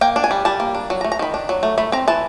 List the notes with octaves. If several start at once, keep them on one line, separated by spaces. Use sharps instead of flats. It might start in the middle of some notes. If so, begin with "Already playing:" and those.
A#3 G5
D4
G#5
G3
G3 A5
A#3
D4
F#3
A#5
A3
A#5
D#3 B5
D4
F#3
A3
A3 B5
C4 A#5
E3 A5